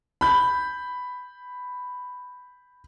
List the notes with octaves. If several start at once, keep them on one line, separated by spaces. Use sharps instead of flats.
B5 G6